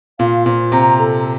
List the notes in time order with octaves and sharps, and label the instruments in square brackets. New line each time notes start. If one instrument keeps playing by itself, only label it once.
[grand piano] A#2 [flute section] F5
[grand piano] A#2 [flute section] C5
[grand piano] C3 [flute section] A#5
[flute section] A4